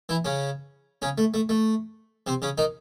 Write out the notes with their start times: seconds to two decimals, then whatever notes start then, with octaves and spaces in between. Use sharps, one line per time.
0.09 E3 E4
0.25 C#3 C#4
1.02 C#3 C#4
1.18 A3
1.34 A3
1.49 A3
2.27 C3 C4
2.42 C#3 C#4
2.58 D#3 D#4